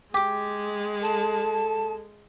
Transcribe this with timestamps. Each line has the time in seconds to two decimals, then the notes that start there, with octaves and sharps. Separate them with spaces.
0.14 G#3 G4 D6
1.02 A4 A5